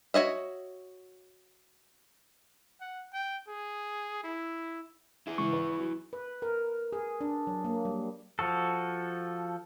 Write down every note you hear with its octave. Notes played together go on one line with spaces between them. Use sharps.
F#4 C#5 D#5 E5
F#5
G5
G#4
E4
E4 G#4
G#2 C#3 E3 C#6
B4
F#3
B4
A#4
G#4
D4
F#3
A#3
G3
F3 F#4 A4